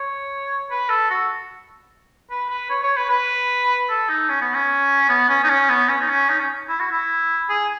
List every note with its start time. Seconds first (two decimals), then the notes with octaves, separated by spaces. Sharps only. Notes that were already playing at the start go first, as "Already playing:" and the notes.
Already playing: C#5
0.71 B4
0.90 A4
1.10 F#4
2.30 B4
2.50 B4
2.70 C#5
2.83 C#5
2.97 B4
3.10 B4
3.90 A4
4.09 D#4
4.29 C#4
4.41 B3
4.54 C#4
5.09 B3
5.29 C#4
5.44 D#4
5.49 C#4
5.69 B3
5.89 C#4
6.01 D#4
6.09 C#4
6.29 D#4
6.39 C#4
6.69 E4
6.80 F#4
6.91 E4
7.49 G#4